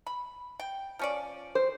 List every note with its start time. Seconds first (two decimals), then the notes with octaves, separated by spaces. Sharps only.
0.07 B5
0.60 G5
0.99 F3 C#4 D5
1.55 C5